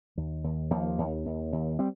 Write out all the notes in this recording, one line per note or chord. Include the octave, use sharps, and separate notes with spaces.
D#2
D#2
D#2 F3 A#3
D#2
D#2
D#2
G3 C4